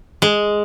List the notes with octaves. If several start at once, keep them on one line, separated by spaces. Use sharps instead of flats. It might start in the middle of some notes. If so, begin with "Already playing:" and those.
G#3